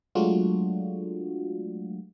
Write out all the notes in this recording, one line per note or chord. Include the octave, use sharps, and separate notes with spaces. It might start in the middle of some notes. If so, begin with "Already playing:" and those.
F#3 G#3 A3 D4 F4 F#4